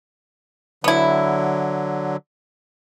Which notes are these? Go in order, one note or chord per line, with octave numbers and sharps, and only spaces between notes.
D3 F#3 B3 E4